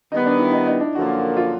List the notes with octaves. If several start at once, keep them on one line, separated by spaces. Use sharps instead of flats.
D#3 G3 B3 D#4
D4
E4
D#4
D#4
D4
F#2 D3 F3 A#3 F#4
F4